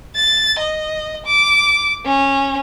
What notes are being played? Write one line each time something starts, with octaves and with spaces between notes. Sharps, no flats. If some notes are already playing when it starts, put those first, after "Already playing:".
A6
D#5
D6
C#4